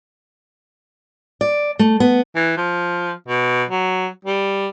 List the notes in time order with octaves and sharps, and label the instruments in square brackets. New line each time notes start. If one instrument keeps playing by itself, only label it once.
[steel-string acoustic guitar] D5
A3
B3
[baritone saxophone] E3
F3
B2
F#3
G3